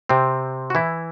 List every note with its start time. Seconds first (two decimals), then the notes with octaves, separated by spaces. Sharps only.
0.09 C3 C4
0.70 F#4
0.75 E3 E4